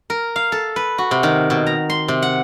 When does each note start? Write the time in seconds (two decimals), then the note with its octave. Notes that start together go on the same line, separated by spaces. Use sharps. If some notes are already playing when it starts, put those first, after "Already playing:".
0.10 A#4
0.36 F5
0.52 A4
0.76 B4
0.98 F#4
1.11 C3
1.23 D#3
1.50 B2
1.66 A#5
1.90 C6
2.08 C3
2.22 F#5